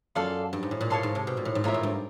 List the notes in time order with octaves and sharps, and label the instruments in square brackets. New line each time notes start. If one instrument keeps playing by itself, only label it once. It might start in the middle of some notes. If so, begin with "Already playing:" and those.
[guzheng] F#2 [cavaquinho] F4 A4 D5 F5
[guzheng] G2
G#2
A2
A#2
[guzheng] A2 [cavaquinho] C#5 F5 A5 C6
[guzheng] G#2
C3
B2
A#2
A2
G#2
[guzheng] A2 [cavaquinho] F4 A#4 C#5 E5
[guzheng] G#2
G2